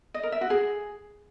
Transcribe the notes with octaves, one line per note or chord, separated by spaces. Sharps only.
D#5
A#4
E5
F#4
G#4